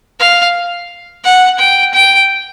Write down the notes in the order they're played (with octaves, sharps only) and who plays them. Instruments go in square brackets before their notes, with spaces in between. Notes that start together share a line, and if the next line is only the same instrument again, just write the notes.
[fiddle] F5
F#5
G5
G5